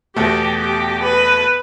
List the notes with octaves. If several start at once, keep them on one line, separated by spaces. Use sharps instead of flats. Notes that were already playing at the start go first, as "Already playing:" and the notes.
E2 B2 A3 G4
G4
B4